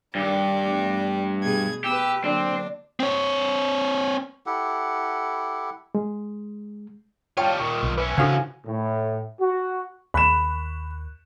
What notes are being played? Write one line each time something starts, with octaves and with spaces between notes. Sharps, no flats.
G2 D#3 G4 D5
E3 A3 B3
B2 G#4 G#6
B3 G4 B4 E6
D3 F#3 A#3 C4 D4
C4 C#5
E4 G4 A4 F#5
G#3
G3 F4 C#5 F5 G5 A5
A#2 D#3 C#6
B1
E3 C#4 B4
C#3 D4 F#4 A4 C5 F5 G#5
A2
F#4
D#2 B5 C#6 F#6 E7